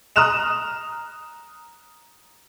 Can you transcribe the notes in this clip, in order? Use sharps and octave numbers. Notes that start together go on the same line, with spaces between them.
A#5 D#6 F6 F#6 E7 F7